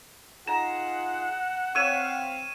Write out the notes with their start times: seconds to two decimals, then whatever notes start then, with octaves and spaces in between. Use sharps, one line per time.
0.47 D#4 F4 G#4 F#5 A#5 E7
1.75 C4 C#5 E5 F5 C#6 D#7 E7